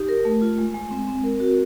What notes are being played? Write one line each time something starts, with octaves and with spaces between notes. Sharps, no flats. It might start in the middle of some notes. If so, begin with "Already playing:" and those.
Already playing: D#4 G4
A#4
A3
F4
G#3
G#3
C4
C4
A#4
F#4